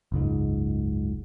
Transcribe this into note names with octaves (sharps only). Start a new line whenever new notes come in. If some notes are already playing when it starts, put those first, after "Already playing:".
F#1 C#2 G#2